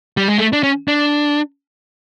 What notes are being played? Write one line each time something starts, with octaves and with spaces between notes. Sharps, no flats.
G3
G#3
A3
D4
C#4
D4